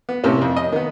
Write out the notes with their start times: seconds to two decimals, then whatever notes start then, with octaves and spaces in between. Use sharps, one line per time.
0.09 B3
0.24 A2 C3 A#3 C#4
0.41 F2
0.56 D#5
0.72 D#3 B3